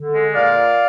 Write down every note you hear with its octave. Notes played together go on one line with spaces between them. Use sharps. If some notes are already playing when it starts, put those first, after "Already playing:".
Already playing: D3
G#3
A#2 D5 F5